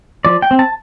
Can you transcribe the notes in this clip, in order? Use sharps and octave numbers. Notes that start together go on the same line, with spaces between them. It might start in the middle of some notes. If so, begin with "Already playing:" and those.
F3 D5
G5
C4
A5